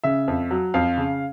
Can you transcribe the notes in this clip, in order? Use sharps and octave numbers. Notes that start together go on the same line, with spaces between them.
C#3 E5
F2
F#3
F2 F5
C#3